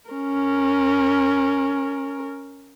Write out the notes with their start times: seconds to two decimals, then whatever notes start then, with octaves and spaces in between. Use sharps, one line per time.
0.10 C#4 A#4